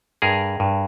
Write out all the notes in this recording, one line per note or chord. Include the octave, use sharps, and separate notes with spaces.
G2 G#4 A#4
G2